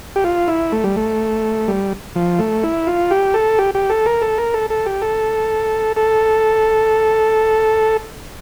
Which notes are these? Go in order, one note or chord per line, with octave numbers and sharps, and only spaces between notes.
G4
F4
E4
A3
G3
A3
G3
F3
A3
E4
F4
G4
A4
G4
G4
A4
A#4
A4
A#4
A4
A4
G4
A4
A4